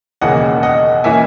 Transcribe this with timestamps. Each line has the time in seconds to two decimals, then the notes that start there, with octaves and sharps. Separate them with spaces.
0.21 E1 D#2 C#3 E3 A#3 D#5 F#5
0.63 D#5 F#5
1.04 E3 A#3 C#4 E4 E5 G#5